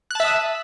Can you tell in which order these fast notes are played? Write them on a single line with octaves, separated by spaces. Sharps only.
F#6 A5 E5 D#6